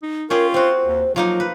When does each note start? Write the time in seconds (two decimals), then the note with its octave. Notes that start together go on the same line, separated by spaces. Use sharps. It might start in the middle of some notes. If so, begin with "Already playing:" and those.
0.03 D#4
0.30 C#4 F4 G4 G#4 A#4
0.54 C4 F#4 C5
0.85 D#2
1.16 F3 F#3 A#3 D#4 F4
1.40 B4